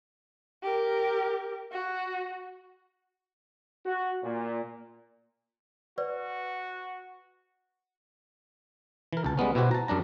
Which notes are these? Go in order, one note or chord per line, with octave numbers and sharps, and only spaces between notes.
G4 A#4
F#4
F#4
A#2
F#4 B4 D5
E3 A#4
C#2 A5
G3 G#3 B3 C#4
B2 E4 F#4 G4 C5
A5 A#5
F#2 G3 D4 A#5